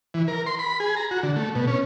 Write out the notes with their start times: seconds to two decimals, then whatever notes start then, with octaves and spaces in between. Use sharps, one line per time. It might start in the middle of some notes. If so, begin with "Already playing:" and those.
0.14 E3
0.28 A#4
0.46 C6
0.59 B5
0.80 G#4
0.97 A#5
1.11 F#4
1.23 D3
1.36 A3
1.55 B2
1.68 C#4